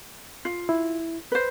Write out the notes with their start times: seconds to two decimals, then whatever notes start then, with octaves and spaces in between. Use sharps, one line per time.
0.45 F4
0.69 E4
1.32 B4 C5